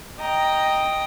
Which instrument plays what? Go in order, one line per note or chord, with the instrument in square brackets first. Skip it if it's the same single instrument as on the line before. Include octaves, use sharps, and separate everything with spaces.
[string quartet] D#5 G5 A#5